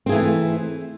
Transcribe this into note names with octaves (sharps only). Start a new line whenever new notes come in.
E3 A3 C4 G#4